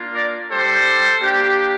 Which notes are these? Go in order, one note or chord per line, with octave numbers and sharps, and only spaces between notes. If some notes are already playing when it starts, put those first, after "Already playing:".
Already playing: A#3 D4 F4
A#4 D5
G3 D4 G4 A4 C5
A#3 D4 G4